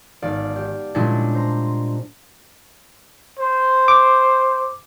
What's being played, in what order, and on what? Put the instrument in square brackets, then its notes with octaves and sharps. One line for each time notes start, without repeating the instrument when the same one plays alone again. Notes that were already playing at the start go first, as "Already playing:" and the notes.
[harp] G#1 B3 D5 F5
G4
A#2 G3 G#3 C#4 D4 E4
C5 A#5
[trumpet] C5
[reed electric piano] D6